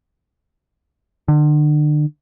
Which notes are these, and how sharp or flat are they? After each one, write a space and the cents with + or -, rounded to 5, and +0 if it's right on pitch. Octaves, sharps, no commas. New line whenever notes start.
D3 +35